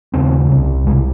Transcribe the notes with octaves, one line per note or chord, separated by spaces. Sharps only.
D#2 C#3 C4
C2 C3
C2 C3 G#3